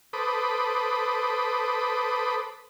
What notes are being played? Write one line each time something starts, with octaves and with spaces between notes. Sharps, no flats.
A4 B4 C5 B5 D6 D#6